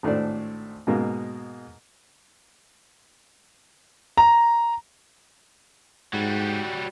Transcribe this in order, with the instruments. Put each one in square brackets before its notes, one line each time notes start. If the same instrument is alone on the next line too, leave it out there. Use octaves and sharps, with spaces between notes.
[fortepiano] G#1 A2 A3 D4 C5 D5
G#2 B2 G#3 A#3
[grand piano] A#5
[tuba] G#2 [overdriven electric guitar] F#3 G3